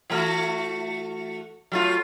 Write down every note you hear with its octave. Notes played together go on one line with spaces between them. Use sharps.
E3 A3 F#4
F#3 A3 F4